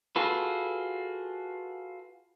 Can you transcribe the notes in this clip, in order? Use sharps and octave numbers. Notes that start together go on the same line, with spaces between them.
F4 F#4 G#4 A4 B4